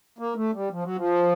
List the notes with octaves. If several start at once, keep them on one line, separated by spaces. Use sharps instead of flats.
A#3
A3
G3
F3
F#3
F3